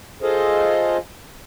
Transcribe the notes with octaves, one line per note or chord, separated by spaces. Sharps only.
F4 G#4 A4 C5 D#5 F5